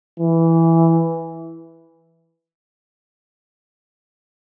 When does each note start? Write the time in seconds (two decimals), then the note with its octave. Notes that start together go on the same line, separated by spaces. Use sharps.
0.20 E3